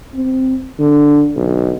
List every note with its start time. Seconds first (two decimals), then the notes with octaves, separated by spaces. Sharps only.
0.14 C4
0.79 D3
1.36 B1